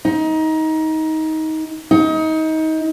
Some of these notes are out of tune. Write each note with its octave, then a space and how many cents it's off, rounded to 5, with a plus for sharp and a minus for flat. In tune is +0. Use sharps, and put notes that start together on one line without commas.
D#4 +20
D#4 +25